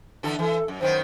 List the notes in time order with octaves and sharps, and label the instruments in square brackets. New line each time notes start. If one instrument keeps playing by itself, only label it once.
[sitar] D3 E3 A4
[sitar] E3 [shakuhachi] A4
[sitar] F#2
[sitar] F#2 D#3 B3 [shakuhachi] C5